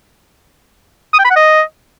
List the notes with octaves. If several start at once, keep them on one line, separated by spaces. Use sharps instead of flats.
D#6
G5
B5
F#5
D#5